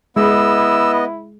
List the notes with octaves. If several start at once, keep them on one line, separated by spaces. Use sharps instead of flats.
G#3 B3 E4 D#5 E6